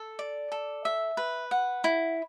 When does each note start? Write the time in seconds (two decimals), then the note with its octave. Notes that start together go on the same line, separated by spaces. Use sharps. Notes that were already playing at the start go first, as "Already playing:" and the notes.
Already playing: A4
0.19 D5
0.52 A4
0.85 E5
1.17 B4
1.51 F#5
1.84 E4